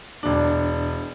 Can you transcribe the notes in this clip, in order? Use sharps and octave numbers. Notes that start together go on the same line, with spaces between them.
E1 D4